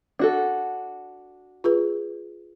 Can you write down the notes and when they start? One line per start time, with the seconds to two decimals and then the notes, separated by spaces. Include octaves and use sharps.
0.19 D4 F#4 A4
1.64 F4 G#4 B4